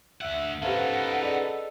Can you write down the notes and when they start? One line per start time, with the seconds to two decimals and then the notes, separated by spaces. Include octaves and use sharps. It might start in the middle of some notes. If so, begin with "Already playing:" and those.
0.21 D2 E5 F#5
0.62 C#4 D#4 G4 A4 B4 C5 F5 F#5
1.21 G#4 D5 D#5